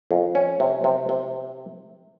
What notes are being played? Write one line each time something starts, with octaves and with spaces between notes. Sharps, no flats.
F2
C#4
C3
C3
C3